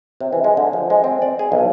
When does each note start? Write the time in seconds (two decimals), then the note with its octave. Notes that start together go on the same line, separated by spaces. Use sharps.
0.21 C3
0.33 E3
0.44 G#3
0.57 D3
0.73 F3
0.90 G#3
1.04 C4
1.22 D5
1.39 G#4
1.52 B1